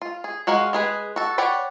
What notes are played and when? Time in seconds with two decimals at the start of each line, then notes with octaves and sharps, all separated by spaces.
0.02 F4
0.24 G#4
0.47 G#3 F#4 A#4 F5 F#5
0.73 G#3 G#4 B4
1.16 F#4 A4
1.38 C#5 D5 F#5 G5 B5